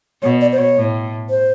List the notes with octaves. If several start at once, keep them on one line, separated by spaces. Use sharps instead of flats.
B2 C#5
D5
C5
C#5
A2
C5